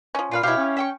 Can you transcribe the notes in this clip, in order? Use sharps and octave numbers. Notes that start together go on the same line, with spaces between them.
F3 C#4
A#2 F4 B4 F5
B2 E4 G4 C#5 F5
C#4
E5 G5 C#6